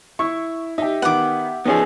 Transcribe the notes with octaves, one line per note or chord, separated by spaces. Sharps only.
E4 C#6
D#4 G4 E5
D#3 B3 F#5 D6
F3 B3 C#4 D#4 G4 G#4